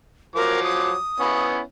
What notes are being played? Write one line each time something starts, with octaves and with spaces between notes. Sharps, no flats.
F3 F#3 A#4 D6
D#6
B3 C#4 E4